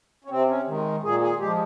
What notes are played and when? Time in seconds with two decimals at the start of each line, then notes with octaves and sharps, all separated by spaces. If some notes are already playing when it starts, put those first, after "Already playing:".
0.24 C#4
0.30 C3 C4
0.48 C#4
0.67 D#3 G#3
1.03 A#2 G#4
1.22 G#4
1.39 F3 G#3 G4